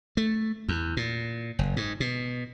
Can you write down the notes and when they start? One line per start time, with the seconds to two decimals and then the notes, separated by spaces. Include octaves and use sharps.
0.17 A3
0.69 E2
0.97 A#2
1.59 F#1
1.77 G#2
2.00 B2